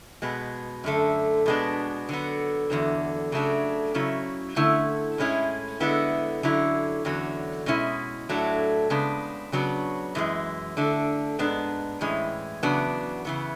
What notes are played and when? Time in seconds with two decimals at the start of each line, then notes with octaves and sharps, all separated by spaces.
0.22 B2 G#3 B3
0.84 F#2 D3 A3
1.46 B2 G#3 B3 D4
2.09 D3 F#3 B3
2.70 E2 D3 F#3
3.32 C#3 F#3 A3 D4
3.94 C#3 F#3 C#4 E4
4.56 D3 A3 C#4 E4
5.18 A2 G#3 C#4 E4
5.80 D3 G#3 B3 E4
6.43 D3 F#3 C#4 E4
7.05 E2 D3 F#3 C#4
7.66 B2 G#3 C#4 E4
8.29 A2 F#3 A3 D4
8.90 C#3 G#3 B3 D4
9.52 C#3 F#3 B3 D4
10.15 F#2 E3 G#3
10.77 D3 A3 D4
11.39 G#2 G#3 B3 D4
12.01 A2 E3 G#3 C#4
12.63 E2 C#3 F#3 B3 D4
13.25 C#3 E3 B3